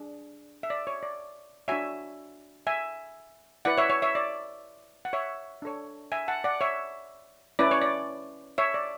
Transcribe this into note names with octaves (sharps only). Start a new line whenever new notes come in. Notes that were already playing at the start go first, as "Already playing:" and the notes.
Already playing: D4 G#4
E5
D5
C#5
D5
D4 F#4 C#5 E5 G#5
E5 G#5
E4 B4 D5 F#5
C#5 E5
C#5
C#5 E5
D5
F#5
C#5 E5
D4 A4 C#5
E5 G#5
F#5 A5
D5 F#5
C#5 E5
C#4 E4 B4 D5
C#5
D5
C#5 E5
D5